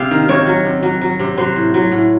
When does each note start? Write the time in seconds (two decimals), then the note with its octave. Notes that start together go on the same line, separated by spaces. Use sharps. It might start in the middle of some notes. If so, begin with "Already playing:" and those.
Already playing: C3 F5
0.11 D#3
0.28 C3 C#5
0.46 F#3
0.65 C3
0.83 F#3
1.01 F#3
1.19 C3
1.38 F#3 C5
1.56 A2
1.74 F#3
1.92 A2